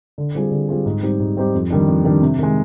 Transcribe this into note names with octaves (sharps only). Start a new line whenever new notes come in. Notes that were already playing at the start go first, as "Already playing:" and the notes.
D3
G3 C4 F4 G#4
D3
G3 C4 F4 G#4
G#2
G3 C4 D#4 G4
G#2
G3 C4 D#4 G4
F2
D#3 G3 D4
F2
D#3 G3 D4
C3
D#3 G#3